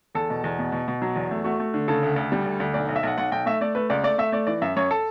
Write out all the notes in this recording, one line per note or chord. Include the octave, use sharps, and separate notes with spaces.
E2 A4
B2
E2
B2
B2
B2
F#3
E2
A3
A3 F#4
A3
D3
C#3 A4
D2
D2
G3
D2
D2
B1 D5
B1
E5
B1 F#5
B1 F#5
B1 G5
A3 E5
A3 D5
A3 B4
C#2 D5
A3 D5
A3 E5
A3 D5
E3 D5
F#2 E5
F#2 C#5
A4